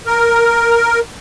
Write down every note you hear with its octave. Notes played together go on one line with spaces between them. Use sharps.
A#4